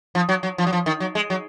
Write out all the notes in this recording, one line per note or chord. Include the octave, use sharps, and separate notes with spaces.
F3
F#3
F#3
F3
F#3
F3
D#3
F#3
G#3
F#3